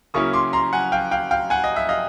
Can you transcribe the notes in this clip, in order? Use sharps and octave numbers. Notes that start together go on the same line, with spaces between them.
C#3 F#3 A#3 C#4 E4 C#6 D#6
C6 D6
A#5 C6
F#5 G#5
F5 G5
F5 G5
F5 G5
F#5 G#5
D#5
E5
D#5 F5